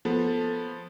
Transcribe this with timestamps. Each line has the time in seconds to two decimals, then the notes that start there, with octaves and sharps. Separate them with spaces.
0.05 F3 B3 A4